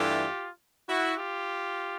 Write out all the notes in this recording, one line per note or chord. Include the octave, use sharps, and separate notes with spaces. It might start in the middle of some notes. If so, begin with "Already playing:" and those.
Already playing: G2 E3 A3 D4 F4 G4
E4 F#4
F4 G4